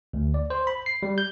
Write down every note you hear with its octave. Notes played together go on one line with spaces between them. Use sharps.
D2
D5
C5
B5
C7
G3
G6